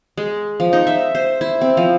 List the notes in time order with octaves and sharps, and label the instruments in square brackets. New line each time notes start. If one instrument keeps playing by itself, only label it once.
[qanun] G#3
F3
D#4
E5
C5
E4
C4
F3